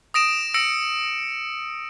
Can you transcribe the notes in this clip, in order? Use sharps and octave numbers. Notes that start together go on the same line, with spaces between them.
D#6 A#6 D7 E7
E6 A#6 C#7 D7